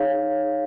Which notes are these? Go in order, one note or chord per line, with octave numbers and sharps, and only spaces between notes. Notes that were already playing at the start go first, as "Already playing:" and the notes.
Already playing: D#4 G#4 C#5 F5